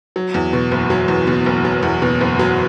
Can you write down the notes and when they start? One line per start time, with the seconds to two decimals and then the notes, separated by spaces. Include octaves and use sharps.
0.16 F#3
0.34 E2
0.53 B2
0.71 F#1
0.90 F#3
1.08 E2
1.27 B2
1.46 F#1
1.65 F#3
1.83 E2
2.02 B2
2.21 F#1
2.39 F#3